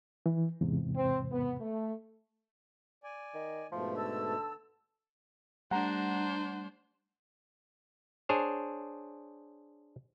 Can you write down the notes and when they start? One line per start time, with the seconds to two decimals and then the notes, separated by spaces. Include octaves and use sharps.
0.26 E3
0.61 E2 G#2 C3
0.95 C4
1.31 B3
1.61 A3
3.04 D5 G#5
3.34 D#3
3.71 G#2 B2 F3 A3
3.96 D3 A5 E6
5.71 G3 A3 D4 C5 F#5 A#5
8.29 D4 G#4 C5 C#5